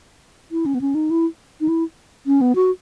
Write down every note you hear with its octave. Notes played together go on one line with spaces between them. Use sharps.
E4
C#4
B3
C#4
D#4
E4
D#4
E4
C#4
B3
F#4